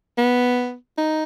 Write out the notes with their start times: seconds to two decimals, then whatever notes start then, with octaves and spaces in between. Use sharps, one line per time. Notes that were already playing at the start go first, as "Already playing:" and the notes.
0.18 B3
0.98 D#4